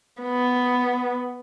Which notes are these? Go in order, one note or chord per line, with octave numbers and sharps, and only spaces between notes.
B3